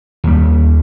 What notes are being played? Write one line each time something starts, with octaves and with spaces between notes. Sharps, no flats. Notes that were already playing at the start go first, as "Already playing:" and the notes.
D#2 G3